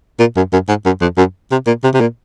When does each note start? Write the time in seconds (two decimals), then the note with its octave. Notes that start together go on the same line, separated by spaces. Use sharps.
0.19 A#2
0.37 F#2
0.53 F#2
0.69 G#2
0.86 F#2
1.01 F2
1.18 F#2
1.52 C3
1.67 A#2
1.84 C3
1.94 C3
2.01 A#2